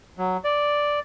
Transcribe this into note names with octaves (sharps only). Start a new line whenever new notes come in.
F#3
D5